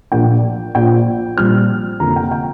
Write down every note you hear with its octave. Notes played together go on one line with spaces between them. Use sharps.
A#1 A#2 A#3 D4 G5
A#1 A#2 F3 G5
A#1 A#2 G3 C4 F6
F1 F2 D3 A#3 A#5
G5
G5